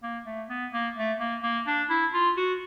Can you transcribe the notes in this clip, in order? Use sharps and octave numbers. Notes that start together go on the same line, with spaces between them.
A#3
A3
B3
A#3
A3
A#3
A#3
D4
E4
F4
F#4